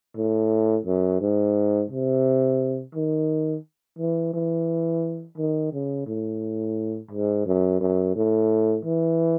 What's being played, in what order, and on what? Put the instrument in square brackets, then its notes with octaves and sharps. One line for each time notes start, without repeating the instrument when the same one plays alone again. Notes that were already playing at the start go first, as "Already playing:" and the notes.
[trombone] A2
F#2
G#2
C3
D#3
E3
E3
D#3
C#3
A2
G#2
F#2
F#2
A2
E3